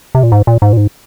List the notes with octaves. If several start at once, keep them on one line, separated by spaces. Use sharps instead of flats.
C3
A#2
G#2
A#2
G#2
A#2
G#2